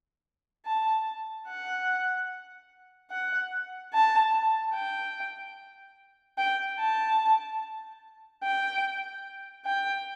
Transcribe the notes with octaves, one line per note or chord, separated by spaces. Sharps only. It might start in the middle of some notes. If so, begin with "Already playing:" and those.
A5
F#5
F#5
A5
G5
G5
A5
G5
G5